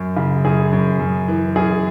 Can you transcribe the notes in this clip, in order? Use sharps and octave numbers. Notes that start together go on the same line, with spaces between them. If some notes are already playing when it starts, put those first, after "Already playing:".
Already playing: F#2
C#3
F#2 G#4
F#2
F#2
E3
F#2 G#4